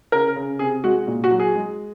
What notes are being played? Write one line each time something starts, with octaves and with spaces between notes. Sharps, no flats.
C#3 A#4
C#3
C3 G#4
G#3 F#4
A#2
F#4
F#3
G#4
G#3